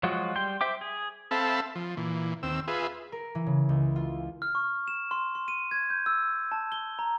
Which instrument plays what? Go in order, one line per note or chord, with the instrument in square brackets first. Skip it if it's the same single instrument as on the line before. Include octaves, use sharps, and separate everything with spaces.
[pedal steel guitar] F3 F#3 G#3 F4 F#4
G3 G5 C6
C5 E5 G5 D6
G#4
[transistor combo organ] C4 A4 E5 F5 A5 B5
F3
A#2 E3
D#2 C4 E6
F4 G#4 B4 E5
[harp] A#4
E3
C#3
C#2
F4
[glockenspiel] F6
C#6
E7
C6
C6
D#7
G#6
G6
E6
A5
G7
A#5